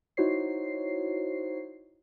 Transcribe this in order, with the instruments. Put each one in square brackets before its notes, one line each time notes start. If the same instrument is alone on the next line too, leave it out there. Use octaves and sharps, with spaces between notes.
[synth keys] D#4 E4 F#4 C5 C#5 C7